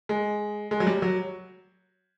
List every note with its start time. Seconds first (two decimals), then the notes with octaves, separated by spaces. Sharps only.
0.09 G#3
0.71 G#3
0.80 F#3
0.87 G3
1.02 F#3